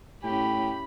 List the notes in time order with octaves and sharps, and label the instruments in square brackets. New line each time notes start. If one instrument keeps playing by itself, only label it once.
[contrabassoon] A2 [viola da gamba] C#4 E4 G4 [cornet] G5 [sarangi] B5